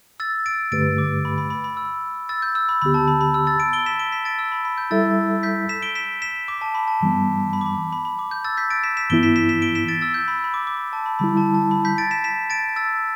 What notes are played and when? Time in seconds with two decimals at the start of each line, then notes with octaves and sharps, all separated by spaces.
0.20 E6 A6
0.46 A6 D7
0.72 G2 D3 A3 G4 B4 A6 D7
0.98 D6
1.25 B5
1.38 B5
1.50 B5
1.64 B5
1.77 E6
2.29 E6 A6
2.42 G6
2.55 E6
2.69 B5
2.82 D2 D3 B3 G4 B5
2.94 A5
3.08 B5
3.21 B5
3.34 E6
3.47 E6 A6
3.60 A6 D7
3.73 D7 G7
3.86 B6 E7
3.99 D7 G7
4.12 B6 E7
4.25 A6 D7
4.39 E6
4.52 B5
4.65 B5
4.78 G6
4.91 G3 E4 A4 E5 E6 A6
5.43 G6 B6
5.69 B6 E7
5.82 D7 G7
5.95 B6 E7
6.22 B6 E7
6.48 D6
6.61 A5
6.75 B5
6.88 A5
7.01 G2 E3 G3 B3
7.53 B5
7.61 D6
7.66 B5
7.92 B5
8.05 B5
8.19 D6
8.31 G6
8.44 E6 A6
8.57 G6 B6
8.70 A6 D7
8.83 B6 E7
8.97 B6 E7
9.10 G2 E3 B3 E4 D7 G7
9.23 B6 E7
9.36 B6 E7
9.49 B6 E7
9.62 D7 G7
9.75 B6 E7
9.88 A6 D7
10.01 E6 A6
10.14 G6
10.28 B5
10.44 B5
10.54 D6
10.67 D6
10.93 A5
11.06 B5
11.19 D3 G3 E4 B5
11.37 A5
11.54 A5
11.71 B5
11.85 G6 B6
11.98 A6 D7
12.11 B6 E7
12.24 B6 E7
12.50 A6 D7
12.76 E6 A6